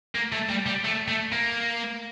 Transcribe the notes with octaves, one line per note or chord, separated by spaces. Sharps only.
A#3
A3
G3
G3
A3
A3
A#3